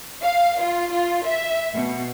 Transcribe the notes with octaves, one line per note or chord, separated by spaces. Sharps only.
F5
F4
F4
E5
B2